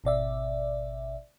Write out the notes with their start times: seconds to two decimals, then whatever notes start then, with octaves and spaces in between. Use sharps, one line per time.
0.04 G#1 B2 D5 E5